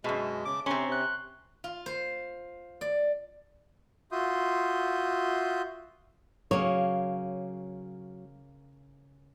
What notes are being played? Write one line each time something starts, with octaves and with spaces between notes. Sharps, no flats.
F#2 B2 G#3 E5 A5
C#3 D6
C3 C4 C#4 A#5 C6 C#6
C3 C6 F#6
F4
C5
D5
F4 F#4 E5 C6 D#6 G6
C#3 F#3 A#3 C#5